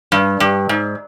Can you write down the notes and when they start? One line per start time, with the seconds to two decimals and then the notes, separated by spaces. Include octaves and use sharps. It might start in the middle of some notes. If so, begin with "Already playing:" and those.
0.12 G2
0.40 G2
0.69 G#2